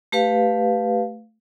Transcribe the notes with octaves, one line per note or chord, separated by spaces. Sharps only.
A3 G4 B4 F5